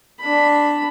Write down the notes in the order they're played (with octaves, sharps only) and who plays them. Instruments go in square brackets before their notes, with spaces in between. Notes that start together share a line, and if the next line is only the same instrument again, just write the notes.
[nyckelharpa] D4 B5